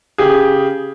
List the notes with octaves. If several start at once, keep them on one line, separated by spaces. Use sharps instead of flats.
C#3 G4 G#4